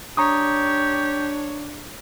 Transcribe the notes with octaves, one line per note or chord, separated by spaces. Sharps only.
D4 G4 C#5 A#5 C#6 D#6